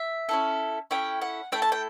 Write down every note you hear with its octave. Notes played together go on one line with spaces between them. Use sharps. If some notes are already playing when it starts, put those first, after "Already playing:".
Already playing: E5
C#4 E4 A4
C#4 E4 A4 G5
F#5
A3 E4 A4 G5
A5
G5